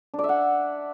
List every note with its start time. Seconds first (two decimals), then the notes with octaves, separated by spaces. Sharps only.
0.14 D4
0.19 D5
0.24 E5
0.29 F#5